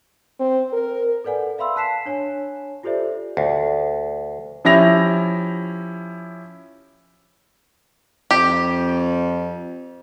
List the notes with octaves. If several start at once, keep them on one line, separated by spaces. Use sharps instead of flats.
C4
A#4
A4 B4 D5 F#5 G#5
E5 F5 B5 C6 E6
A5 F#6 B6 C7 E7
D4 C#5 G#5
F4 G4 A4 C5 D5 E5
D2
F3 C#4 E4 G4 A#6 F7
F2 G4